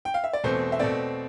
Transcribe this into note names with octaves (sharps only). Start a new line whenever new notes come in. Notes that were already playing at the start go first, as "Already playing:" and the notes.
G5
F5
E5
D5
E2 B2 A3 C4 C5
E5
B2 A3 C4 D5